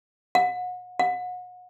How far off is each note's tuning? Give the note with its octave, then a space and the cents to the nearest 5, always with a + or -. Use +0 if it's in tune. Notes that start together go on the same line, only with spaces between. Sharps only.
F#5 -35
F#5 -35